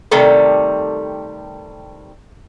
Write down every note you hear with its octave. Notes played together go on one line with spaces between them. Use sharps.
C3 D#3 G3 A3 A4 A#4